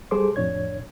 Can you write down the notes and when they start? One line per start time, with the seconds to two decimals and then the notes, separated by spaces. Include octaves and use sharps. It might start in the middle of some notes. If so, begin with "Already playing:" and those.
0.11 G3 G#4 A4 C5 C6 D6
0.36 F2 A2 D4 C#5 G#6